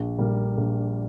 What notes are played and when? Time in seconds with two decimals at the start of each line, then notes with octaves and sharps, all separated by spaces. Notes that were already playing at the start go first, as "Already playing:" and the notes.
Already playing: A#1
0.18 A#2 G3 A#3
0.57 A#1